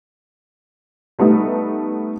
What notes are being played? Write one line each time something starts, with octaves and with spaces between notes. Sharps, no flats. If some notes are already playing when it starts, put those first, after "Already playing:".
G3 A3 B3 D#4